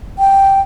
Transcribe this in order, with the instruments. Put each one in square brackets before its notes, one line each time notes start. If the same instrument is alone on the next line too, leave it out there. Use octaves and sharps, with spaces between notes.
[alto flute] G5